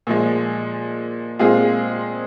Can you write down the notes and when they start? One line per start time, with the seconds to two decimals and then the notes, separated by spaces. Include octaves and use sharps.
0.07 A#2 F3 G#3
1.39 A#2 G#3 C4 F4 G#4